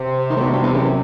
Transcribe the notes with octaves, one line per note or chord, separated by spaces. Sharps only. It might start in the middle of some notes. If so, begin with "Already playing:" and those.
Already playing: C3
D#3
A2
B2
G2
E2
F#2